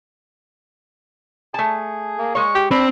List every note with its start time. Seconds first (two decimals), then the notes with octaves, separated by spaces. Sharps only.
1.54 A3 G#4 A5
2.18 A#3
2.35 G#3 C#5 C#6
2.55 G4
2.71 C4 D4 B5